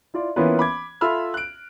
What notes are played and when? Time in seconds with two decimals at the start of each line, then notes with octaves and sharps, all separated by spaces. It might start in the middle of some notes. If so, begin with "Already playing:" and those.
0.14 E4 F4 D5
0.36 E3 A#3 B3 C#4 F4 B4
0.59 B5 D6 G#6
1.01 F4 A4 E5 B5 E6 F6
1.34 F#6 D7